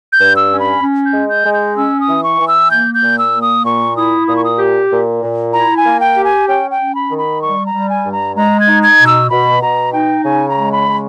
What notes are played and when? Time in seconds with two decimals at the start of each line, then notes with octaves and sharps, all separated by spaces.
0.13 G6
0.20 G2
0.36 E6
0.51 C#4
0.60 B5
0.82 C#4
1.06 G6
1.13 G#3
1.29 G6
1.45 G#3
1.54 G6
1.76 C#4 E6
2.00 D#6
2.08 E3
2.24 C#6
2.39 E3
2.48 E6
2.70 A#3 G6
2.94 G6
3.02 A#2
3.19 E6
3.34 A#3
3.42 D#6
3.65 A#2 C#6
3.97 E4 D#6
4.28 A#2 D#6
4.37 C#6
4.44 D#6
4.59 G4
4.91 A#2
5.22 A#2
5.53 E4 A#5
5.77 G#5
5.86 A#3
6.00 G5
6.16 G4
6.24 G#5
6.48 C#4 G5
6.71 G5
6.79 C#4
6.95 B5
7.11 D#3
7.18 B5
7.42 G3 C#6
7.66 A#5
7.73 G3
7.89 G#5
8.05 G2
8.12 A#5
8.36 G#3 A#5
8.60 G#6
8.68 D#4
8.83 G#6
9.00 B2
9.07 E6
9.30 B2 B5
9.62 B2 A#5
9.93 D#4 G5
10.24 C#3 G#5
10.49 A#5
10.56 G#3
10.72 B5
10.88 C#3